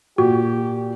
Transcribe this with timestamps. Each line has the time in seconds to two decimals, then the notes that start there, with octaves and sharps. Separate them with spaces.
0.18 A#2 F#4 G4